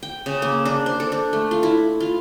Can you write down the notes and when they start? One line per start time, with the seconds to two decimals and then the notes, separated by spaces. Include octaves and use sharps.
0.03 G5
0.26 C#3
0.42 A#3
0.65 D4
0.86 C5
1.00 A4
1.12 D4
1.33 A3
1.51 F4
1.63 E4
2.00 F4